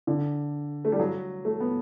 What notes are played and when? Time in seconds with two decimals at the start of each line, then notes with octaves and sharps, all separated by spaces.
0.07 D3
0.85 A3
0.92 G3
0.99 F#3
1.45 A3
1.60 B3